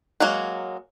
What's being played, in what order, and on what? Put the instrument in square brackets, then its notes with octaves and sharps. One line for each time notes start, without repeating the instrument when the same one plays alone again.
[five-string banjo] F#3 G#3 A#3 F#4